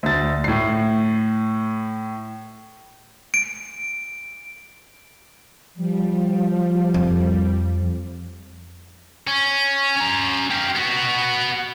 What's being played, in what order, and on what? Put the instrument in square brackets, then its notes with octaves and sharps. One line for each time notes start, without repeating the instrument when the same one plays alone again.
[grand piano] D2 A6
A2 C7
[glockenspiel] D7
[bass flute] F3 [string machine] G3
[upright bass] F2
[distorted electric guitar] C#4
C#4 A#5
G4 F5
B3 F#4